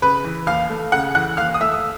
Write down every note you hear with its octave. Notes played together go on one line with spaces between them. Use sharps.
C#3 B4 B5
E3
D#2 F5 F6
A3
C#3 F#5 F#6
E3 F#5 F#6
D#2 F5 F6
D#6
A3 E5 E6
E6